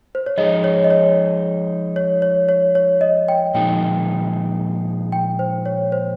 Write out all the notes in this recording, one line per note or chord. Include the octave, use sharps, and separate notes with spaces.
C5
C#5
F3 G#3 D#4 G#4 D#5
C#5
D#5
C#5
C#5
C#5
C#5
C#5
D#5
G5
A#2 F3 G#3 D#4 G5
G5
C5
C#5
C5